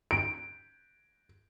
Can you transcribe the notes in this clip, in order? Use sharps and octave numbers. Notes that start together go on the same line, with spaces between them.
D7